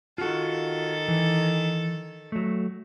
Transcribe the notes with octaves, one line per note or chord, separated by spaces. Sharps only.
D#3 F4 F#4 A4
E3
F#3 A3